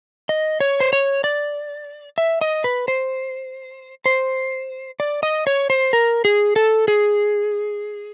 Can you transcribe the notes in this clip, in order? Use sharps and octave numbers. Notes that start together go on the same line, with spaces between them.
D#5
C#5
C5
C#5
D5
E5
D#5
B4
C5
C5
D5
D#5
C#5
C5
A#4
G#4
A4
G#4